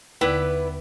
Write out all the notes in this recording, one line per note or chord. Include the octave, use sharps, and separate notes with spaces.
D#2 D3 B3 E4 B4 D5